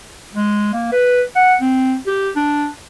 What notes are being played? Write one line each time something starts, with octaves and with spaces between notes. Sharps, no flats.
G#3
A#3
B4
F#5
C4
G4
D4